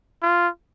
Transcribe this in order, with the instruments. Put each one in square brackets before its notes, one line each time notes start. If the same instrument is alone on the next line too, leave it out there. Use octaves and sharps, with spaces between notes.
[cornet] F4